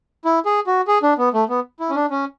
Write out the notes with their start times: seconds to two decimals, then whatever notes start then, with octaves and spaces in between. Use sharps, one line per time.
0.25 E4
0.46 G#4
0.67 F#4
0.88 G#4
1.03 D4
1.18 B3
1.34 A3
1.49 B3
1.80 E4
1.90 C#4
1.95 D4
2.11 C#4